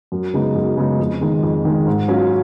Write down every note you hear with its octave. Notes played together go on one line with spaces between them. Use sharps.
F#2
C#3 G#3 B3 D#4
F#2
C#3 G#3 B3 D#4
F2
D#3 G#3
F2
D#3 G#3
G#2
F#3 C#4 F4